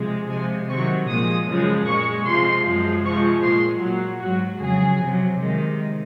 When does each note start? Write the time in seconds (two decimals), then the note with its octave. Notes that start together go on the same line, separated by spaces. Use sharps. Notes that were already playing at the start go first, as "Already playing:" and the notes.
Already playing: C3 F3 G#3
0.30 C3 F3 G#3 G#5
0.69 C3 D#3 F#3 C#6
1.08 A#2 F3 G#3 D#6
1.48 F#2 C#3 F3 G#3
1.87 A#2 G#3 C#6
2.26 C3 F3 G#3 C6
2.65 F#2 F3 G#3
3.04 C3 F3 G#3 C#6
3.44 A#2 G#3 C6
3.83 A#2 F#3
4.22 G#2 F#3 F#4
4.61 F2 C#3 F#3 G#4
5.01 C3 F#3
5.40 C3 D#3 G#3